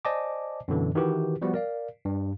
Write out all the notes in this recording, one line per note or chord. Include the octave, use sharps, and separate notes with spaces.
C5 D5 D#5 G#5 A5 D6
F#2 B2 D3 E3
D#3 E3 E4 F#4 G4 B4
F3 G3 B3 F#4
A#4 D5 F5
G2